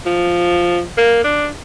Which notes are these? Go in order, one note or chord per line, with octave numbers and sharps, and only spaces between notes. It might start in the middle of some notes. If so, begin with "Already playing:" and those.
F3
A#3
D4